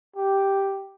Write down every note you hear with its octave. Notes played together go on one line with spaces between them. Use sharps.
G4